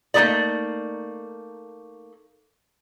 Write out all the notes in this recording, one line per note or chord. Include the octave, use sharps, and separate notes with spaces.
A3 A#3 D#4 G4 G#4 D5